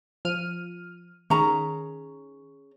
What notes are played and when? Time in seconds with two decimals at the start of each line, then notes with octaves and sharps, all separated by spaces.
0.25 F3 F6 D#7
1.30 D#3 C#4 G#4 A#5